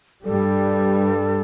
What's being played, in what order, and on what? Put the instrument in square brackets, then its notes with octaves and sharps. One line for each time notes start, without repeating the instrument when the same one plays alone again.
[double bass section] G2 G3 [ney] A4